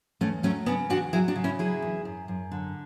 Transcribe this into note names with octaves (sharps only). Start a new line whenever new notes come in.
E2 A3 C#4
F#3 A3 C#4
C#3 B3 D4
E2 D4 F#4
F#3 E4 G#4
D4 F#4
C#3
C#4 E4
F#3 E4 G#4
E2
F#2
F#2
D3